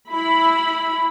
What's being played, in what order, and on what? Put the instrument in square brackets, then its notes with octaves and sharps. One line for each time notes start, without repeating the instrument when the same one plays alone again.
[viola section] E4 B5